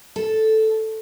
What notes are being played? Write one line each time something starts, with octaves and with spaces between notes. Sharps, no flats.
A4